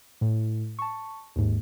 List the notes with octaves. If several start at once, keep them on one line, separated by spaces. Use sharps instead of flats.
A2
A5 C#6
D#2 G#2